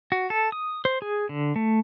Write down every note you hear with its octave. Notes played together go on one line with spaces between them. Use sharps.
F#4
A4
D#6
C5
G#4
D3
A3